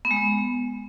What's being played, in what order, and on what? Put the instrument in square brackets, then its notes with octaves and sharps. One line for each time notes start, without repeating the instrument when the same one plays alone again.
[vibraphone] B3
G#3
B3